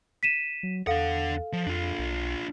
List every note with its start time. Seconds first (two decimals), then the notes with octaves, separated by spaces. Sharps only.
0.23 B6 D#7 E7
0.63 F#3
0.87 E2 D4 A4 F5 F#5
1.53 F3
1.66 F2 D4 F4
1.99 B1